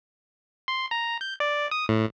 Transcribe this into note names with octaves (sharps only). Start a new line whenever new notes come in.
C6
A#5
G6
D5
D#6
A2